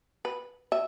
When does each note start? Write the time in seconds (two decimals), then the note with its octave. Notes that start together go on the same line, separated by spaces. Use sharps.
0.25 B4
0.72 E5